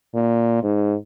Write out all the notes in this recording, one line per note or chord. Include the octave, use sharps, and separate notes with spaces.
A#2
G#2